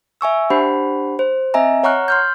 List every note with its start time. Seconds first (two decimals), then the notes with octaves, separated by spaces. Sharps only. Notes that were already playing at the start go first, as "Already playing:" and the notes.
0.21 E5 G#5 C#6 E6
0.50 D4 G4 C5 F#5 B5
1.19 C5
1.54 C4 D#5 E5 G#5 A#5
1.83 C#5 F#5 A#5 C#6 F6 F#6
2.08 C6 F6 G6